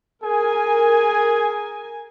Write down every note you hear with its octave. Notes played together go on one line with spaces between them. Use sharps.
G#4 A#4 G#5